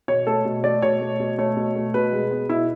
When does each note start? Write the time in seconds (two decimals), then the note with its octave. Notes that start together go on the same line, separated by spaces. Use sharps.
0.08 B2 C#5
0.27 A3 A4
0.45 B2
0.64 A3 D5
0.82 B2 C#5
1.01 A3
1.20 B2
1.38 A3 C#5
1.57 B2
1.75 A3
1.94 B2 B4
2.13 G#3
2.31 B3
2.49 B2 E4